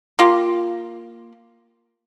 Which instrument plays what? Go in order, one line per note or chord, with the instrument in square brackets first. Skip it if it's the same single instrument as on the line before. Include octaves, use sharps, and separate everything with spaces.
[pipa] A#3 F4 G4